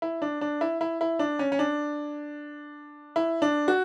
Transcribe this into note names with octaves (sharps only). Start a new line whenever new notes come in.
E4
D4
D4
E4
E4
E4
D4
C#4
C#4
D4
E4
D4
F#4